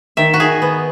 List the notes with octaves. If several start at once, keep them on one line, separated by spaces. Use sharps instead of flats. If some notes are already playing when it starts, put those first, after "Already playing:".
D#3 E5
F#4
D#3 G#4
B3